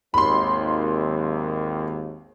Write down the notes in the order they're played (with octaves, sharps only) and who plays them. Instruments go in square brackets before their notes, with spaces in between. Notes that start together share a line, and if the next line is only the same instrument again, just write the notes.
[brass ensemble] G#1 D#2 [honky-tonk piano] B5 C6